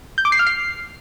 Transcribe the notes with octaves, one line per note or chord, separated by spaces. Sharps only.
G6
D6
C7
F6
C7